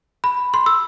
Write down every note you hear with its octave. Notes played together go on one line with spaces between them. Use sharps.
B5
C6
E6